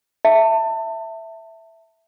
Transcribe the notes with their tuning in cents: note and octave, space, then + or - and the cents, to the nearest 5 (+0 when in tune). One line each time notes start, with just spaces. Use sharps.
E5 +0 A5 +30